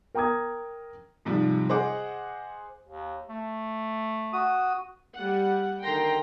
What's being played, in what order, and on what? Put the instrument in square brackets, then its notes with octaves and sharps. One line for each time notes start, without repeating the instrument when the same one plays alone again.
[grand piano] A#4 G5 A#5 D6 D#6 G#6
[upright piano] G#2 C3 F3 G3
G#4 C5 D#5 F#5 D6
[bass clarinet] D#2
A3
[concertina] F#4 D#6
[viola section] G3 F#5
D3 D#3 A#4 G5 A#5 C6